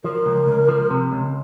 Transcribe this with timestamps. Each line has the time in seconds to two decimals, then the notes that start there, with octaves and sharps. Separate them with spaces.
0.04 F3 A#4
0.26 C#2
0.47 C#2
0.69 F3
0.90 C3
1.12 C#2